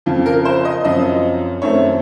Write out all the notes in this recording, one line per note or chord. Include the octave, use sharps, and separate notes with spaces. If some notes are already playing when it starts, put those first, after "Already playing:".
F2 C#3 F3
A#4
C5
D#5
F#2 F3 C4 D#5
F#2 D#3 A3 C4 C#5